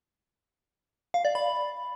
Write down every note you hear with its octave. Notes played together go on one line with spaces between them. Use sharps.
F5
D5
B5